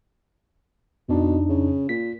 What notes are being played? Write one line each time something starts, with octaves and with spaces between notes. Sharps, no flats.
F2 B2 D4 D#4
C#3
A#2 B6